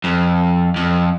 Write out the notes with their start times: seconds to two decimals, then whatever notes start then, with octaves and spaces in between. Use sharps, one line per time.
0.04 F2
0.76 F2